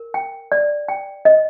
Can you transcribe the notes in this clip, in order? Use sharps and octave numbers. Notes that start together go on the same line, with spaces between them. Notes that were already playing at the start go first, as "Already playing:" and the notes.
Already playing: A#4
G5
D5
G5
D#5